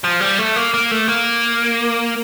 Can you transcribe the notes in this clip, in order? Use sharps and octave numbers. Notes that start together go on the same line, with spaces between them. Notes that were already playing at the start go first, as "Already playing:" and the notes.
F3
G3
A3
A#3
A#3
A3
A#3